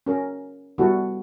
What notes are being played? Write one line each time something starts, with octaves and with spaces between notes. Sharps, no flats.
C#4 A#4
G3 B3 E4 F#4 A4